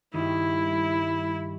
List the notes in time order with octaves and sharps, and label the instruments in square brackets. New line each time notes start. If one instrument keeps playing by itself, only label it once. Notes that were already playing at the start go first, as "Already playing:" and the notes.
[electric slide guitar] G2 D#3 G3 [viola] E4